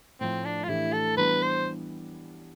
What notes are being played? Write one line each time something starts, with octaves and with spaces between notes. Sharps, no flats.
A2 F3 A3 C4
D4
F4
A2 E3 A3 D4 E4 G4
A4
E3 G3 B3 D4 B4
C5